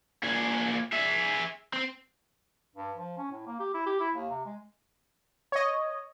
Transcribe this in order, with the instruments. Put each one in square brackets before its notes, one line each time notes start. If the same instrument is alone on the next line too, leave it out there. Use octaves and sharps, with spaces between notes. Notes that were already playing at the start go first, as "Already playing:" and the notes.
[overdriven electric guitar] A#2 G#4
G#4 E5
C4
[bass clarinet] G2
F3
C#4
A2
A#3
G4
E4
G4
E4
D#2
C3
G#3
[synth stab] C#5 D#5